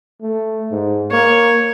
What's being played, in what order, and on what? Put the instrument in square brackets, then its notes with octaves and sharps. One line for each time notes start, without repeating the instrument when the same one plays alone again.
[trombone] A3
G#2
[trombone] A#3 [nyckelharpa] C#5